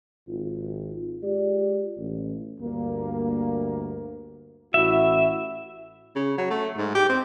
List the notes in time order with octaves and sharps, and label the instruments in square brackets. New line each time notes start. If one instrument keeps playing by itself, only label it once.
[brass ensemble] G#1 F4
G#3 F4 G4 D5
A1
[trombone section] D2 G2 A#3
[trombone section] A1 E4 F#4 [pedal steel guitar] E5
[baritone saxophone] C#3
F#3
A3
G#2
G4
C4